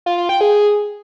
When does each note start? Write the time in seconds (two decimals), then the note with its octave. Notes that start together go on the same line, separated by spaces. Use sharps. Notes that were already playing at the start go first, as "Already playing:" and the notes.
0.06 F4
0.18 F4
0.29 G5
0.41 G#4